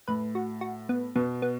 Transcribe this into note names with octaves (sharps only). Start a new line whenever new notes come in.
A2 B4
F#4
F#4
B3
B2 B3
B3